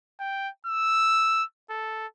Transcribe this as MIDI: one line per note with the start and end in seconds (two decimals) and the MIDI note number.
0.20 0.49 79
0.66 1.44 88
1.70 2.07 69